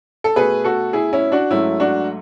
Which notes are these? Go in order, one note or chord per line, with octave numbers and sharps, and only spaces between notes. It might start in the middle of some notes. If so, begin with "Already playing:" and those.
A4
B2 A3 G#4 B4
F#4 A4
E4 G#4
C#4 E4
D4 F#4
G#2 F#3 A3 C#4 E4
D4 F#4